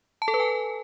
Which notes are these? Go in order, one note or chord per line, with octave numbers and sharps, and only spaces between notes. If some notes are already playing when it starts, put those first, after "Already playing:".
A5
A4
B4
G#5